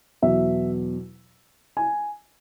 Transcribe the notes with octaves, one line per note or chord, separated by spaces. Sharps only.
E2 B2 F#3 E5
G#5